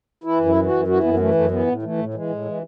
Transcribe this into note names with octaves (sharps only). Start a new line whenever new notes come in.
E3 E4
F#2
E4
E3
F#2 F#4
E3 F#4
F#2 B3
B3
E3 A3
F#2 A3
E3 B3
A2
E3 A3
A2
E3 G#3
A2
E3